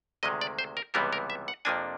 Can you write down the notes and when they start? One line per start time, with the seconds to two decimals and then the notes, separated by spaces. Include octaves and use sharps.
0.23 D2 C3 D#3 G#3 D#5
0.41 D5
0.59 C5
0.77 A#4
0.94 C#2 C3 E3 G3 B3 A#4
1.13 A#4
1.30 E5
1.48 F#5
1.65 F2 C3 F3 A#3 D4 G#5